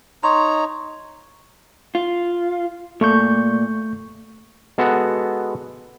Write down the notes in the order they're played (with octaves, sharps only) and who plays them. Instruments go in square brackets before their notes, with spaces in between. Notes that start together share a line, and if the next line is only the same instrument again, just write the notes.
[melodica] D#4 C#5 A#5 [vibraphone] C6
[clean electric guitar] F4
[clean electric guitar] A#2 [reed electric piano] A3 C#6 G6
[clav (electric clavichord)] G#3 B3 F#4 A4